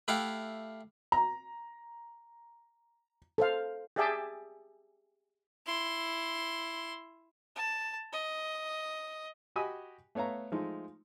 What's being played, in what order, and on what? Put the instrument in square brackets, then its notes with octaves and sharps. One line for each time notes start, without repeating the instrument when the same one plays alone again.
[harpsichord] A3 E4 G4 F5 F#5
[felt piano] A#5
[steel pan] A4 C5 F5
G4 G#4 D5 E5 G5 A5
[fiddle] E4 C6
A5
D#5
[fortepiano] F#4 G4 D#5 G#5 B5 D#6
A3 B3 C#5 F5 A#5
F3 G#3 A3 D#4